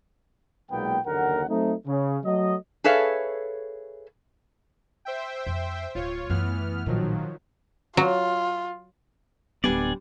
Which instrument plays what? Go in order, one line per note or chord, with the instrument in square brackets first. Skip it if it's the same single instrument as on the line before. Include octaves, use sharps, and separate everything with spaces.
[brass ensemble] B1 A#2 G#3 A#3 B3 G5
F#1 D#2 D3 A#4 F#5
F#3 A3 C4 D#4
C#3
F#3 A3 D#5
[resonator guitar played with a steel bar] G#4 A4 B4 C#5 E5 F5
[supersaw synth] C5 E5 G5
[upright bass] F2
[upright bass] D1 [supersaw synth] F4 C#5
[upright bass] F#2 A3 [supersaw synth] E3 B3 F6
[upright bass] A1 A#2 [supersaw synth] D#3 F3 F#3
[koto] F#3 [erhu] F4
[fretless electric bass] D1 B3 [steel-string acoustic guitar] G3 D4 C5 [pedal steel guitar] D5 G#5